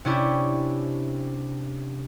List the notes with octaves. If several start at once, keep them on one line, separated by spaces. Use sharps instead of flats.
C3 C#4 D4 E4 G4 C#6